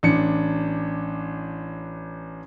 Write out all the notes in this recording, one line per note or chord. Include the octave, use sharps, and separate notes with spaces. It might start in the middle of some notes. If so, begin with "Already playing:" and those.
A1 D4 C#7